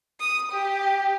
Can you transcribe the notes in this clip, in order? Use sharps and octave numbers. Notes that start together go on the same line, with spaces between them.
D#6
G4